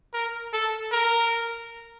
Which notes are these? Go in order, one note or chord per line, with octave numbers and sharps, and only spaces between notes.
A#4
A4
A#4